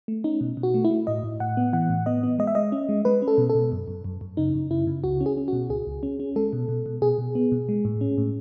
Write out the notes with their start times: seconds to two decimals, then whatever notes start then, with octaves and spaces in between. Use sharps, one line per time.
0.08 A3
0.24 C#4 D#4
0.41 B2
0.57 B2
0.63 F#4
0.74 A3
0.85 E4
0.91 A3
1.07 A2 D#5
1.23 A2
1.40 A2 F#5
1.57 B3
1.73 E3 F#5
1.89 A2
2.06 B3 D#5
2.23 B3
2.39 G#3 D#5
2.47 E5
2.55 G#3 D#5
2.72 C#4
2.89 G#3
3.05 G#3 B4
3.22 C#4
3.28 A4
3.38 B2
3.50 A4
3.55 B2
3.72 F#2
3.88 F#2
4.04 F#2
4.21 F#2
4.37 C#3 D#4
4.54 F#2
4.71 C#3 E4
4.87 C#3
5.04 C#2 F#4
5.21 C#4
5.26 G#4
5.37 C#4
5.48 B2 F#4
5.70 C#2 G#4
5.87 C#2
6.03 C#4
6.20 C#4
6.36 G#3 A4
6.53 B2
6.69 B2
6.86 B2
7.02 B2 G#4
7.18 B2
7.35 B3
7.52 B2
7.69 G#3
7.85 A2
8.01 C#4
8.18 A2